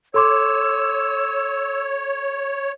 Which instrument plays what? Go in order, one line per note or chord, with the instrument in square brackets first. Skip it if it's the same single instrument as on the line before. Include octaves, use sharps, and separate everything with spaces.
[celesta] A4 C6 D6 [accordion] C#5 [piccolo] E6